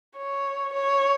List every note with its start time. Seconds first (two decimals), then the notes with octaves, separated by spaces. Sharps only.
0.18 C#5
0.73 C#5